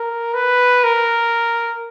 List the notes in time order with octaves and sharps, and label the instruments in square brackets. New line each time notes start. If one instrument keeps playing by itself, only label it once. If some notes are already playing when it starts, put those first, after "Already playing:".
Already playing: [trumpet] A#4
B4
A#4